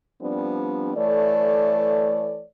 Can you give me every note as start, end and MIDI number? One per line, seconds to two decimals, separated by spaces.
0.21 0.94 53
0.21 0.94 55
0.21 0.94 59
0.21 0.94 60
0.21 0.94 62
0.96 2.44 52
0.96 2.44 57
0.96 2.44 69
0.96 2.44 73
0.96 2.44 74